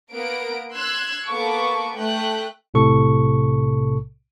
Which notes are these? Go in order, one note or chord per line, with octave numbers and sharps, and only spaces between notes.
A#3 B3 A#4 D7
C6 E6 F#6 G#6
A#3 B3 A4 C#6 D6
A3 G5 F#6
B1 A2 C3 A4 C#6